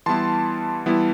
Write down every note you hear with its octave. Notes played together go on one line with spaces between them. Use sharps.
E3 G3 B3 E4 A5 C6
E3 G3 B3 E4